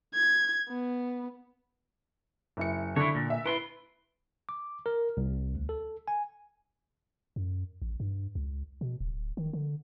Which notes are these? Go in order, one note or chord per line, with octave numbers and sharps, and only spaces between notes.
G#6
B3
F#1 E4 C#7
D3 E4 C#5
A#2
E5
E4 B4 C6
D6
A#4
C2
D2
A4
G#5
F#2
A1
G2
C#2
B2
D1
D#3
D3